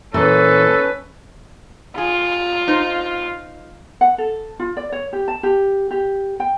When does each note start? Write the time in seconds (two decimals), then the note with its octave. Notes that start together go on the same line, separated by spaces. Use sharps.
0.14 A#2 E3 C#4 A4 B4 C5
1.98 F4 G#4
2.68 D#4 C5
4.01 F#5
4.18 A4
4.60 F4
4.77 D5
4.92 C#5
5.13 G4
5.28 A5
5.43 G4
5.91 G4
6.40 G5